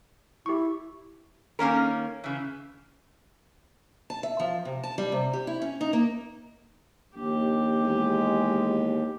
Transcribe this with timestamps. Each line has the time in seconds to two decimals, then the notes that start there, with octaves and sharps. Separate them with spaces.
0.46 E4 G4 C#6
1.59 D#3 A#3 C#4 A#4
2.24 C#3 E3
4.10 A5
4.23 E5
4.40 F3
4.65 C3
4.83 A5
4.98 G3
5.12 C3
5.33 G4
5.47 E4
5.62 C#4
5.81 D#4
5.93 A#3
7.15 A#1 D#2 G4
7.83 E2 G#3